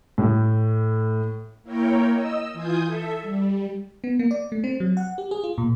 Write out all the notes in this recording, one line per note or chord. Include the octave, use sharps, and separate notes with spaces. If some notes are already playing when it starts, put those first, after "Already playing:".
A2
A#3 E4 A#4 C#5 G5
D#5 E6
E3 F4 G#5 D#6 G6
A4 E5
G3
B3
A#3
D5
A3
C4
F#3
F#5
G4
G#4
F4
A#2